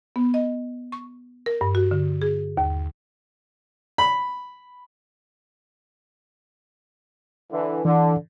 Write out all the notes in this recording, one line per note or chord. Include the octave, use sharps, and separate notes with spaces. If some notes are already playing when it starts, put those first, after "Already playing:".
B3
D#5
C#6
A#4
G2
F#4
D3
G#4
D#2
B5
D3 E3
D3 E3